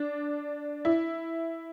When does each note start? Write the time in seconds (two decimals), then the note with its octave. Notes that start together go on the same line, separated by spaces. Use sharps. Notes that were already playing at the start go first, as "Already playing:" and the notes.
Already playing: D4
0.85 E4